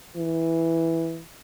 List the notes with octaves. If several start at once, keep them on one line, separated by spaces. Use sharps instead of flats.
E3